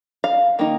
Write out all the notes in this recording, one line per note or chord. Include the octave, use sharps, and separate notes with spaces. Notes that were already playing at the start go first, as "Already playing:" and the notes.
F5
D#3 A#3 D#4